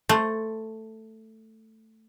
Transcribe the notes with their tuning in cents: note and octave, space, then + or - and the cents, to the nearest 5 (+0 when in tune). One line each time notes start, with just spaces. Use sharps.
A3 +5 C5 +0